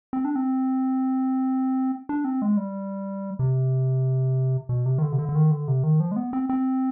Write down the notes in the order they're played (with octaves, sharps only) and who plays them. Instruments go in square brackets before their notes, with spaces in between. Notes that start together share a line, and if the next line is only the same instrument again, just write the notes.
[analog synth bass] C4
D4
C4
D4
C4
G#3
G3
C3
B2
C3
D#3
D3
C3
D3
D3
D#3
D3
C3
D#3
F3
G#3
B3
C4
C4